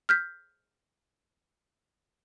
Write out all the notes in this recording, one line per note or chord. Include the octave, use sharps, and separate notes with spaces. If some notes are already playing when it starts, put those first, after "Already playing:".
F6 G6 B6